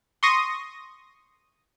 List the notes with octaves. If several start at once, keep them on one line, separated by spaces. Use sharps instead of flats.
C6 C#6 D#6 A#6 D#7